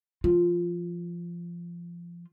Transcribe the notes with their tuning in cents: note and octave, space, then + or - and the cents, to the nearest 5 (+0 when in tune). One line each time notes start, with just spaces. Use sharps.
F3 -20 F4 +0